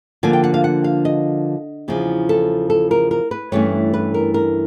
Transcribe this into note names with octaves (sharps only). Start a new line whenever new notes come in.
D3 F3 A#3 D4 G#5
G5
F#5
F5
F#5
F5
D#5
E2 C#3 F3
A4
A4
A#4
A#4
B4
G2 E3 A3 C#4 C#5
B4
A#4
A#4